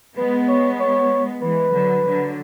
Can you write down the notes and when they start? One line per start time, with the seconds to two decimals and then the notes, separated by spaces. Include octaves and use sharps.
0.17 G#3 B3 B4
0.48 C#5
0.80 C#5
1.42 E3 G#3 B4
1.73 D3 F#3
2.04 D3 F#3